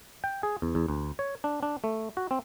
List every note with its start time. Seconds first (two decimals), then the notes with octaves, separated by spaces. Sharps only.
0.24 G5
0.43 G#4
0.62 E2
0.75 E2
0.88 D2
1.19 C#5
1.44 D4
1.63 D4
1.84 A3
2.17 F#4
2.31 C4